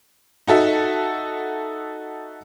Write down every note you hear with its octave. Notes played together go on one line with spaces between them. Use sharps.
D#4 F#4 A4 E5